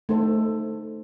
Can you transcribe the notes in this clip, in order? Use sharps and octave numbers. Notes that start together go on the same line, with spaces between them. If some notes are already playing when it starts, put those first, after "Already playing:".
A3 D#4 A4 C5